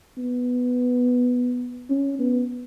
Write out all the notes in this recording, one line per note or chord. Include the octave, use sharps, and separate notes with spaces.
B3
C#4
B3